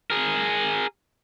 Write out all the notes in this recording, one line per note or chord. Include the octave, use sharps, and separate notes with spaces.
G#4 A#4